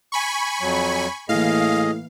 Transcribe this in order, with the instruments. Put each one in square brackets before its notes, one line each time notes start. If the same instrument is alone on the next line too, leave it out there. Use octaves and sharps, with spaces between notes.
[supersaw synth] G#5 B5 C#6
[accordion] F2 F#3
[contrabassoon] A2 [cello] E3 A#3 [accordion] G#4 D#5 [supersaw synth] F5